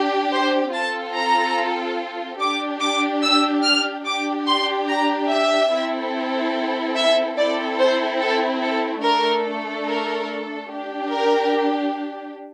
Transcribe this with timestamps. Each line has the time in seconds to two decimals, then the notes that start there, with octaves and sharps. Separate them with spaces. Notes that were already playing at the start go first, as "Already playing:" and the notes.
Already playing: D4 G4
0.32 C5
0.73 C4 F4 A4 A5
1.15 A#5
2.39 D4 G4 D6
2.80 D6
3.22 E6
3.63 F6
4.05 D4 G4 D6
4.47 C6
4.88 A#5
5.29 E5
5.71 C4 E4 A4
6.95 E5
7.37 C4 E4 A4 D5
7.78 C5
8.19 A4
8.62 A4
9.02 A3 D4 A4 A#4
9.86 A#4
10.69 D4 G4
11.10 A#4